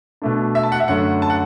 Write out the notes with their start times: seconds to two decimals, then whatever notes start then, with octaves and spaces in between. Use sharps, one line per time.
0.22 B2 A3 D4
0.55 E5
0.63 A5
0.72 F#5
0.80 E5
0.88 F#2 D3 A3 F#5
1.22 A5
1.30 F#5